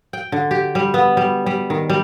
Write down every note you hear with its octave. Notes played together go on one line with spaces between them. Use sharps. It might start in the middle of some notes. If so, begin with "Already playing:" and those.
G5
D3
G4
G3
B3
G3
G3
D#3
G3